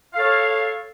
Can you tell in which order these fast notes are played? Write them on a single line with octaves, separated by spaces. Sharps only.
F5 A4 C#5